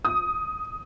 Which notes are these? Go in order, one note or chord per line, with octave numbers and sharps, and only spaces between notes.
D#6